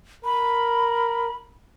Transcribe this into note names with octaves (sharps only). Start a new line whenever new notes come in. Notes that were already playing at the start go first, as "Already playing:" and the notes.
A#4 B5